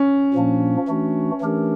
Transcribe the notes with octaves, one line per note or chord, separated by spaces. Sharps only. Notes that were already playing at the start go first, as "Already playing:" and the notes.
Already playing: C#4
A#2 F3 A#3 D4
E3 A3 D4 F#4
E3 A3 D4 G4 A#4